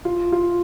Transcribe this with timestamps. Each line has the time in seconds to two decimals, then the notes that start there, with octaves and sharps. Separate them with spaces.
0.05 F4
0.32 F4